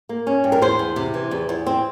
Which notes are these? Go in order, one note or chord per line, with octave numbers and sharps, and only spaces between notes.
A#3
C#4
G2
A#4
E2 C5
E2
C3
E3
E2
E2
C4